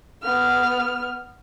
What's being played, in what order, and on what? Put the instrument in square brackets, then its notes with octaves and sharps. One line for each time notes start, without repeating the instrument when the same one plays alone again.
[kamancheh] B3 F6